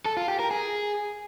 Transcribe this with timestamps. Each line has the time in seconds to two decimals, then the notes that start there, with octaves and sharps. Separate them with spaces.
0.05 A4
0.17 F4
0.28 G4
0.39 A#4
0.51 G#4